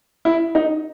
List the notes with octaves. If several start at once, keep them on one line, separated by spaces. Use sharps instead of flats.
E4
D#4